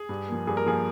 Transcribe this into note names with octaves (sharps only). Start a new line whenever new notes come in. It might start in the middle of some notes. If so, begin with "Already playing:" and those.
Already playing: G#4
G2
F3 A#3
G2 G#4
A#4
F3 A#3 G#4